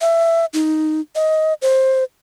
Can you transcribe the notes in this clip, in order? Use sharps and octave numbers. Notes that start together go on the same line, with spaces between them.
E5
D#4
D#5
C5